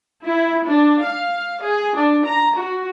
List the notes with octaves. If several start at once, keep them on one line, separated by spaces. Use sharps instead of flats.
E4
D4
F5
G#4
D4
A#5
F#4